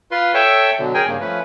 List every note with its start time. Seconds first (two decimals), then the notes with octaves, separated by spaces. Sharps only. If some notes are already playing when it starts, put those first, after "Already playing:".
0.11 F4 B4 C6
0.34 A4 C#5 E5 G5 A5
0.79 B2 D3 F#3
0.94 C#4 G#4 A#4 G5 G#5
1.07 G2 C#3 A#3
1.21 F3 A3 C#4 B4